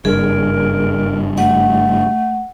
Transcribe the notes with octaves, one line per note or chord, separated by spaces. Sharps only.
F#1 G2 G#4 A#4
A3 F#5